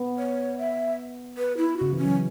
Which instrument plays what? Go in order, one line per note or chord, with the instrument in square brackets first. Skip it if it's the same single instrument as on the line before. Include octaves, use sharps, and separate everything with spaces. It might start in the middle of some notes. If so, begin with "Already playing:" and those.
Already playing: [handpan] B3
[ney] C#5
E5
B4
E4
[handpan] C#3 [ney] F#4
[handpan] E3 [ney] C#4
[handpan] F#3